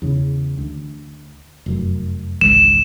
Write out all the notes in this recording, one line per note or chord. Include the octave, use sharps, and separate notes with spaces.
E2 C#3
D2
F1 F#2
G#1 C#2 E3 E7